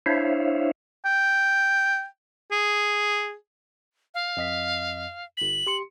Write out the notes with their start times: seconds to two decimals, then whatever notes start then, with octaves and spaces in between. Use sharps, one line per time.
0.06 D4 E4 C5 C#5 E5 F5
1.05 G5
2.52 G#4
4.14 F5
4.37 F2 D#5 B6
5.37 G1 B6 F#7
5.67 G4 C6 C#7